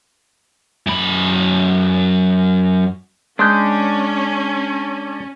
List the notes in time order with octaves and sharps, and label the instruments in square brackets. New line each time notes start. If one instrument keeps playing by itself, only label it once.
[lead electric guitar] F#2 B5
[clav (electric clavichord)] G#3 [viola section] C#4 [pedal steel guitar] D4 G6